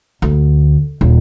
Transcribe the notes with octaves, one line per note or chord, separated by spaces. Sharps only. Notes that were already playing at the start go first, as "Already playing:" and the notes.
D2
D#1